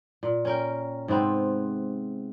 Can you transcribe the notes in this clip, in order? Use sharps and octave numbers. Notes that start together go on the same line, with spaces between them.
A#2
C#4 A#4 G5
G#2 C3 B3 C4